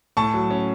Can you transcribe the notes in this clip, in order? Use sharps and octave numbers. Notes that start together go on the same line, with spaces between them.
A2 A5 C#6
F#3
C#4